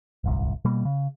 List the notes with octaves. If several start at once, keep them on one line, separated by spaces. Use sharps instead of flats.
D1 G1 C2
B2 G3 A#3
C#3